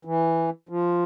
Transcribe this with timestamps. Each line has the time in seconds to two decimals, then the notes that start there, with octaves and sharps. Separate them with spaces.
0.05 E3
0.69 F3